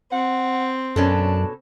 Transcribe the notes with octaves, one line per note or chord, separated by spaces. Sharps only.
C4 F#5
F#2 B2 C#4 D4 A4